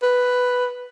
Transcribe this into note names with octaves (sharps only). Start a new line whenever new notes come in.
B4